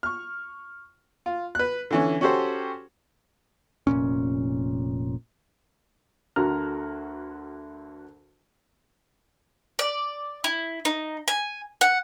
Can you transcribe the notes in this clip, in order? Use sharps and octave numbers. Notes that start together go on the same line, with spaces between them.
C#6 F6
F4
B4 F#6
D3 E3 C#4
C#4 F#4 G4 A4 C5
F1 B1 A#2 C#4
D2 D3 F#4 A#4 A#5 F6
D5
E4
D#4
G#5
F#5